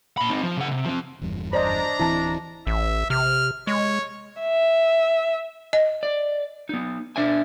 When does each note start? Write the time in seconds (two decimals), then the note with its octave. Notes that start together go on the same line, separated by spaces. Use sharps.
0.17 A#2 B5
0.30 C4 D#4
0.43 F3
0.57 C#3 F#5
0.71 C3
0.85 F3 C4
1.21 F#1 E2 G2
1.53 D4 C5 D5 D#5 A#5
2.00 D1 E3 C4 E4 A5
2.67 A1 E5
3.10 C3 F6
3.67 G#3 C#5
4.40 E5
5.73 D#5
6.03 D5
6.69 B3 D#4
7.16 D4 E5 G#5